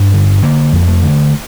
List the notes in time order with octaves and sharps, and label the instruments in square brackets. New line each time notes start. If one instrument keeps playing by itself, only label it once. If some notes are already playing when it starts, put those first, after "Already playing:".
Already playing: [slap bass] G2 D4
D3
D3 A#3
F2
A3
D3